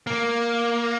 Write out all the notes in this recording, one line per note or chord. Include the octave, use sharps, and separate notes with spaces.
A#3